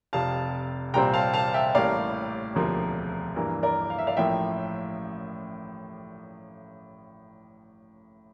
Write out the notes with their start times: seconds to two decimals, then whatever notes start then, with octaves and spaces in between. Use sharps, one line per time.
0.13 F1 F2 C3 F5 A5
0.93 C2 A#2 G3 C4 G5 A#5
1.13 F5 A5
1.34 F5 A5
1.54 E5 G5
1.75 A1 A2 G3 A#3 D5 F5
2.55 E1 D2 C3 F3 A#3
3.36 G2 E3 A#3
3.63 A#4 D5
3.90 F5
3.99 E5
4.07 D5 F5
4.16 A1 A2 F3 A#3 E5 G5